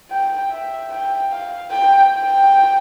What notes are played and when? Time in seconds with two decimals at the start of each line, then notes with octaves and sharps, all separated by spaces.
0.11 G5
0.51 E5
0.91 G5
1.31 F5
1.71 G5
2.12 G5